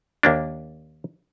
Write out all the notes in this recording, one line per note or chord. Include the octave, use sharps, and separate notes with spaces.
D#2 A#3 D4